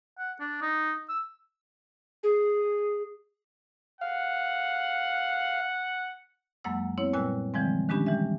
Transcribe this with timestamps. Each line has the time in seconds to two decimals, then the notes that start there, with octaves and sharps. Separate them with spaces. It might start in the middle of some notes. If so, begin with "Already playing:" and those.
0.19 F#5
0.40 D4
0.62 D#4
1.09 E6
2.23 G#4
4.01 F5 F#5
6.64 F#2 F#3 G#3 A#3 F#5 E6
6.98 B3 C4 E4 C#5
7.13 A#2 G3 B4 G#5 E6 F#6
7.54 D3 E3 F3 G3 G#3 C4
7.89 D#3 G#3 C#4 D4 G4 B5
8.06 E3 G3 G#3 E5